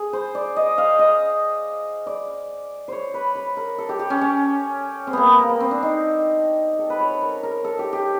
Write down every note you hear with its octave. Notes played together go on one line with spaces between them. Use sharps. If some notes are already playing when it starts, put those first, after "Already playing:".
Already playing: G#4
C5
D5
D#5
F5
D#5
D5
C5 C#5
B4
B4
A#4
A4
G4
G4
C#4
C#4
C4
A#3 B3
A#3
B3
C4
D4
D#4
A4
B4
C#5
B4
A#4
A#4
A4
G4
G4